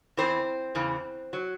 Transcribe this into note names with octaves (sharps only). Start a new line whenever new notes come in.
E2 C#3 E3 C4 C5
E2 C#3 E3
F#3